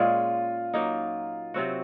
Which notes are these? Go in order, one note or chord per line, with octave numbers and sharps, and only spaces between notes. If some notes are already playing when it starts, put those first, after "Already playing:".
Already playing: A#2 G#3 C#4 F4
F#3 A#3 D#4
C3 F#3 C4 F#4